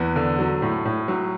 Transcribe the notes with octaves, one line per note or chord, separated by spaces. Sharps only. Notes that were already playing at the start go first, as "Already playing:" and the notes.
Already playing: E2 B4
D3
F#3
A2
A2
F#3